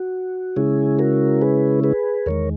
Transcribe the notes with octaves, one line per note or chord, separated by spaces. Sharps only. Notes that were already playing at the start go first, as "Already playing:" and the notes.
Already playing: F#4
C#3 G#3 C#4 E4 G#4
F#4 A#4
G#4 B4
G#4 B4
E2 D#3 G#3 A#4 C#5